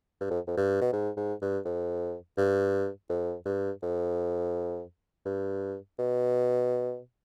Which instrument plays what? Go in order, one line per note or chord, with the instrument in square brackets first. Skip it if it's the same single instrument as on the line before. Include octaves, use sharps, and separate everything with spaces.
[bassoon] G2
F2
F2
G2
B2
G#2
G#2
G2
F2
G2
F2
G2
F2
G2
B2